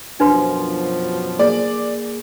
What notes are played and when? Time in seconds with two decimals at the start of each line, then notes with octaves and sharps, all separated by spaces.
0.20 F#2 B2 F3 D4 B4 C6
1.39 A#3 G#4 D5